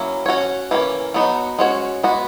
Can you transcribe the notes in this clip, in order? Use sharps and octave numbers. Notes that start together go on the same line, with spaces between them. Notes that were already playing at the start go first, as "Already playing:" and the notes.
Already playing: F#3 A#3 C#4 E4
C#4 F#4 C#5
E3 A#3 C#4
F#3 B3 D#4 F#4
G#3 C#4 F#4 C#5
G#3 B3 F#4